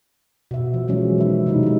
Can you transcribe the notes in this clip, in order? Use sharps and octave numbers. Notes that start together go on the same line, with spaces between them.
B2 E5
F3
E3 F#3 G#3 C#4
D#3 E5
C3 G#3 D#4 E4
G#3 D#4